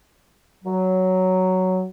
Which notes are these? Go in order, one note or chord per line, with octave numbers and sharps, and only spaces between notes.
F#3